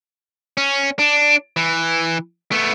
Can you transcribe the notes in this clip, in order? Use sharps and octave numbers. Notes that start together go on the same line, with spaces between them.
C#4
D4
E3
A3 B3